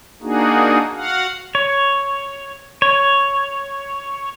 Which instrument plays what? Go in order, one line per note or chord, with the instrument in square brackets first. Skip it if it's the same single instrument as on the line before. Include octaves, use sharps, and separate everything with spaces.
[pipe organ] A#3 D4 D#4 F#4 G#4
F#4 F5 F#5
[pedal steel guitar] C#5
C#5